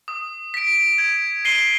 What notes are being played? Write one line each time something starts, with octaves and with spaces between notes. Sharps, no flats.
D#6
B6 D7
G#6
C7 D#7 G7